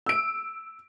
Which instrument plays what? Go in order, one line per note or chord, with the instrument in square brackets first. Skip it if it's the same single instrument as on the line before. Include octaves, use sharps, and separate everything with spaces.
[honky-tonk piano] E6 D7